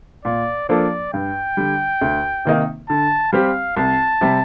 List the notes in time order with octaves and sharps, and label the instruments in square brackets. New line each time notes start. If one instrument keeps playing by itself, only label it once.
[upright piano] A#2 [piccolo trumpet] D5
[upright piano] F3 A#3 D4 A4 [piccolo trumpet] D5
[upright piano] G2 [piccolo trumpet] G5
[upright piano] D3 G3
D2
C3 D#3 A#3 D#4
[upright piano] D3 [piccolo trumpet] A5
[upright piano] G3 C4 G4 [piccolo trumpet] F5
[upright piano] C2 [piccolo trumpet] A5
[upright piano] C3 G3